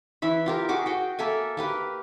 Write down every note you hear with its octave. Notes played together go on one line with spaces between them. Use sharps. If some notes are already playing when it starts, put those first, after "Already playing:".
E3 E5 B5
F4 G4 A#4
F#4 G#4 D6
F#4 G5
A#3 A4 E5 G#5
A#3 G4 B4